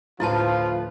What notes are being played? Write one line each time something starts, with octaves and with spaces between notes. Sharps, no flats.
D2 A2 F3 E4 F4 B4 A5